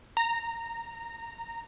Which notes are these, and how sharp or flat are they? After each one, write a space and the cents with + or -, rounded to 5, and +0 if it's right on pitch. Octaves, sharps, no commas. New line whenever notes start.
A#5 -15